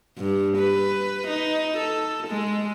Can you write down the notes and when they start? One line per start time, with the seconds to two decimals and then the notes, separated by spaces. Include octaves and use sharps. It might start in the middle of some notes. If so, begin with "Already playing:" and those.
0.18 G2
0.57 B4
1.27 D#4
1.77 A4
2.27 G#3